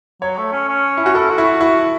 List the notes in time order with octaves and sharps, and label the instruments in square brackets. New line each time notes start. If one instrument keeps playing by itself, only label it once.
[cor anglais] F#3 [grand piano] C#5
[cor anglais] A3
C#4
C#4
[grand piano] E4
[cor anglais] C#4 [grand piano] F#4
[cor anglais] E4 [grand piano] A4
[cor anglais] F#4
[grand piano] E4
[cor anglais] F#4
[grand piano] E4 [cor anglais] F#4